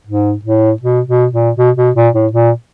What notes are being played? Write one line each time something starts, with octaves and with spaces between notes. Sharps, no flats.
G#2
A2
B2
B2
A#2
B2
B2
A#2
A2
A#2